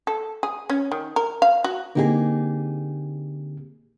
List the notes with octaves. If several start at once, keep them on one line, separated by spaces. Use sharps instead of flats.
A4
G#4
C#4
D#3
A#4
F5
F#4
D3 A#3 C4 D#4 G4 G#4